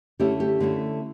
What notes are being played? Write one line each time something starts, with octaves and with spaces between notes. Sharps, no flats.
D3 A3 C#4 E4 G4
G4
D3 A3 C#4 E4